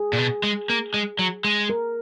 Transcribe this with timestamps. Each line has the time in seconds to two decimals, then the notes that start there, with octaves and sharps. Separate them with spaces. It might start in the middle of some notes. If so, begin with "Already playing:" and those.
Already playing: G#4
0.13 A#2
0.18 B2
0.43 G#3
0.70 A#3
0.94 G#3
1.19 F#3
1.44 G#3
1.69 A#4